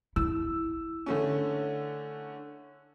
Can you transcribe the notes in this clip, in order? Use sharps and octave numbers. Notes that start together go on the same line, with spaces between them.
E4 E6
D3 A3 C#4